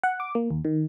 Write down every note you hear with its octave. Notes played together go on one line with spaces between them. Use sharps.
F#5
D6
A#3
D#2
D#3